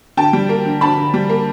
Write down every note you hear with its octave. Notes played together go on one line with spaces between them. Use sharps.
D3 G5 A5
G3
A#3
D3
D3 A5 B5
D3
G3
A#3